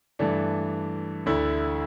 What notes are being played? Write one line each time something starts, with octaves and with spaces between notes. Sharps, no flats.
G2 E3 A3 D4
D2 D3 A3 E4